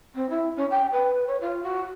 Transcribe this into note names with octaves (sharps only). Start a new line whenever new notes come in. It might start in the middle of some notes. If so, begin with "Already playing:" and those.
C4
E4
C#4
G5
B4
C#5
F4
F#4